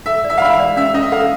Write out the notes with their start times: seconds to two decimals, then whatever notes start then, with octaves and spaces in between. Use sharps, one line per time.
0.06 A4 E5
0.24 D5
0.30 E5
0.37 F5
0.42 E5 B5
0.53 F5
0.59 D5
0.77 C#4 E5
0.94 C#4 D#5
1.12 A4 F5